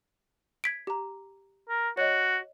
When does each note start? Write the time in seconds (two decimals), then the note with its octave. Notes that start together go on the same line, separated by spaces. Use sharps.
0.64 G#6 B6 D7
0.87 G4 A#5
1.69 A#4
1.97 F#4 C#5 D#5